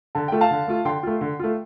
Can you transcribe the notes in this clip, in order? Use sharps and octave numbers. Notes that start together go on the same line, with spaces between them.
D3 A5
A3 F4 G5
F5 A5
D3
A3 F4
D3 G5 C6
A3 F4
D3
A3 F4